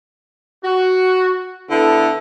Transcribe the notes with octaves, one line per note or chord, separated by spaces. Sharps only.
F#4
D3 B3 E4 A4